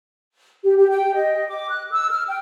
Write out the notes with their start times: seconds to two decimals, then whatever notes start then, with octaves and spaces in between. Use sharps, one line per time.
0.64 G4
0.77 G4
0.88 G5
1.14 D#5
1.47 D6
1.68 F#6
1.90 E6
2.10 F6
2.27 G5